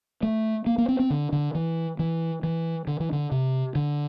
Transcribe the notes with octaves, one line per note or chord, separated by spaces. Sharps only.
A3
A#3
A#3
C4
C4
D3
D3
E3
E3
E3
D3
E3
D3
C3
D3